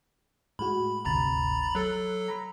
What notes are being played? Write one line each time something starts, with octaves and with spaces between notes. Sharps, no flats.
A2 G#3 F#4 B5
G1 D2 C3 A#5 B5 A6
F#3 A4 F#6
A#5 B5